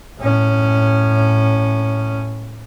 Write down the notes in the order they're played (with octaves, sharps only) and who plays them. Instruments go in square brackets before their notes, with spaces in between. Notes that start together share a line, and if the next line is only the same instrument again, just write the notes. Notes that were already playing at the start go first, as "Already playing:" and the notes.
[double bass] A2 C#4